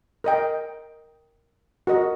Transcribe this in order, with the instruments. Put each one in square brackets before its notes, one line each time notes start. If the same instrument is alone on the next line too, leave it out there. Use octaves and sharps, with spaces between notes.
[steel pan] A#4 D#5 G5
F#4 A#4 D#5